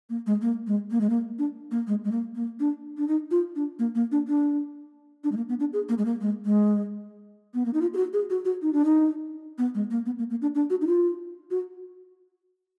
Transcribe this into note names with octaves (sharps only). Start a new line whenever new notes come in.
A#3
G#3
A#3
G#3
A#3
G#3
A#3
D4
A#3
G#3
G#3
A#3
A#3
D4
D4
D#4
F4
D4
A#3
A#3
D4
D4
D4
G#3
A#3
B3
D4
G#4
A#3
G#3
A#3
G#3
G#3
B3
A#3
D#4
F4
G#4
F#4
G#4
F#4
F#4
D#4
D4
D#4
B3
G#3
A#3
B3
A#3
A#3
D4
D4
F#4
D#4
F4
F#4